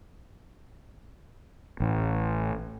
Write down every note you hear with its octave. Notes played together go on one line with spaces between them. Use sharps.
A1